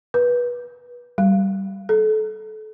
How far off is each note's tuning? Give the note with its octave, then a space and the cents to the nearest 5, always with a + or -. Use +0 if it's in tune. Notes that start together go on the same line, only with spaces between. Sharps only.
B4 -25
G3 -10
A4 -25